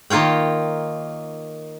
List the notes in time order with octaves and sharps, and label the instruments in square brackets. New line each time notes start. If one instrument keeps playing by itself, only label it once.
[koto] D#3 A#3 F4 C#5 G5